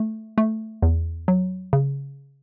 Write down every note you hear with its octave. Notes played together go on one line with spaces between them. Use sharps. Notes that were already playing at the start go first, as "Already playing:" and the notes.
Already playing: A3
A3
E2
F#3
C#3